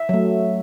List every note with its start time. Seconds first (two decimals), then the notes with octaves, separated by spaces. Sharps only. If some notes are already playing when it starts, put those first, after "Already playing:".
Already playing: E5
0.09 F#3 A3